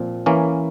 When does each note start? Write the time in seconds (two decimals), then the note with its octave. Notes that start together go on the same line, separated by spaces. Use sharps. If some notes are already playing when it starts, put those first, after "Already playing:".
Already playing: A#2 F3 C4
0.26 E3 A#3 C#4